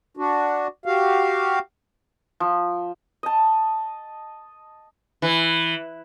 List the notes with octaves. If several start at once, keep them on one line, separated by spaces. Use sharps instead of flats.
D4 F#4
F#4 G4 F5
F3
D#5 A5
E3